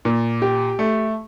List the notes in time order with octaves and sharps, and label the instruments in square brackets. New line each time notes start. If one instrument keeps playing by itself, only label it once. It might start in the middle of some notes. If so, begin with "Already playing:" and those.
[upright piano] A#2
G4
A3